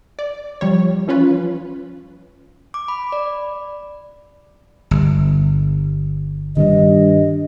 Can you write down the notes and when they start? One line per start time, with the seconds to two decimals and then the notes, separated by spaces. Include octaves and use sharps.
0.19 D5
0.61 F3 G3 C#5
1.07 E3 F3 C#4 F4 B4
2.74 D6
2.88 B5
3.12 D5
4.91 G1
6.57 G2 D#3 C4 D4 D#5